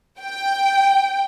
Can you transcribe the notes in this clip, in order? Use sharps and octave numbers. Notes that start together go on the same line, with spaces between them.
G5